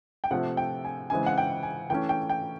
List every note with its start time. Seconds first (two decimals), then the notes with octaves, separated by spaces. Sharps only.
0.24 G5
0.31 C3 F3 A3 C4 F#5
0.57 G5
0.85 G#5
1.10 C#3 E3 G#3 C4 G#5
1.26 F#5
1.38 G5
1.63 G#5
1.90 E3 A3 C#4 G5
2.09 G5
2.30 G5